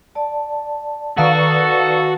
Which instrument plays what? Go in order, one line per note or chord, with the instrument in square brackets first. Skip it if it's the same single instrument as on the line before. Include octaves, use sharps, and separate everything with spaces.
[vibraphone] D5 A5
[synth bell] D#3 F5 A5 [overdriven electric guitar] F#4 [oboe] A4 [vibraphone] B4 D5 C#6